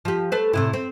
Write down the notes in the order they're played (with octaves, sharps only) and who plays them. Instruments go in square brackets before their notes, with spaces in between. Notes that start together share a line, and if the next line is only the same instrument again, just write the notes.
[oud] F3 G4
A3 B4 C5
A2 C3 E4
C4